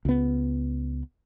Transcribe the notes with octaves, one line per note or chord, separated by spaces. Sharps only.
C#2 B3